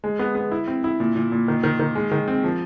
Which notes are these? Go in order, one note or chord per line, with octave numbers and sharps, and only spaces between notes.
G#3
B3
B3
E4
C4
E4
A#2
A#2
A#2
D#3
D#3
D#3
G#3
D#3
C4
F3